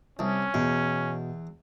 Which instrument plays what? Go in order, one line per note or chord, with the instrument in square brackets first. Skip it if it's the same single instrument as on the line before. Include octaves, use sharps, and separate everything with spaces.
[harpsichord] C2 [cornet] C#4 [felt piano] A5
[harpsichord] E2 [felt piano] B2